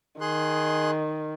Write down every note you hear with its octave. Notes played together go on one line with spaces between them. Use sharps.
D#3 G#4 C6 F#6